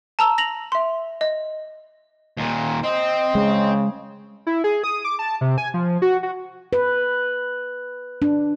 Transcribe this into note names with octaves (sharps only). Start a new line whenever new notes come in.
A5 A#5 E6
A#6 F7 F#7
E5 C6
D#5
D#2 A#2
C4 D#5
C#3 G#3
E4
G#4
D#6
D6
A5
C3
G#5
F3
F#4
F#4
B4
D4